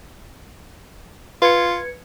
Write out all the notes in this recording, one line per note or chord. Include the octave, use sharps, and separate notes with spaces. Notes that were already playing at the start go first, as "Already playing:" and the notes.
F4 B4 G#6 C#7